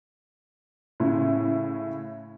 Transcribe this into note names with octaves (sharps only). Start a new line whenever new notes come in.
A2 C#3